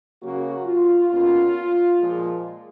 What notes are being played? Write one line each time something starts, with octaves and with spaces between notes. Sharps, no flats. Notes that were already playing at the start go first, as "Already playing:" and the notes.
C#3 F#3 A#3 C#4 F#4
F4
B2 A#3 C#4 F4
A#2 F3 G#3